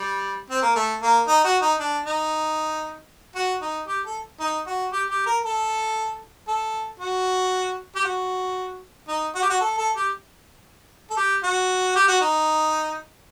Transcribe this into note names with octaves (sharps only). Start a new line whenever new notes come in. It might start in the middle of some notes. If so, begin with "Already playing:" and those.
Already playing: G3
C4
A#3
A3
A#3
D#4
F#4
D#4
D4
D#4
F#4
D#4
G4
A4
D#4
F#4
G4
G4
A#4
A4
A4
F#4
G4
F#4
D#4
F#4
G4
F#4
A4
A4
G4
A4
G4
F#4
G4
F#4
D#4